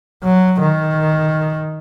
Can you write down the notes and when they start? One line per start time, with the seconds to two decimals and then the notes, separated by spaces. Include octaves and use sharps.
0.24 F#3
0.60 D#3